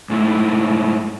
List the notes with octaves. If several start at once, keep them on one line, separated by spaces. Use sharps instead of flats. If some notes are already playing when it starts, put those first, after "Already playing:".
G#2 A3 E4